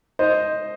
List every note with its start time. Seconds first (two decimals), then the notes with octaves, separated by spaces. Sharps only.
0.19 C5 D#5